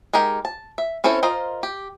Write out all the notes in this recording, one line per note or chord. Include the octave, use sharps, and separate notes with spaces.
G#3 D#4 G4 A#4 G5
A5
E5
C4 C#4 E4 A4 C5
F4 A#4 C5 D#5 F5
G4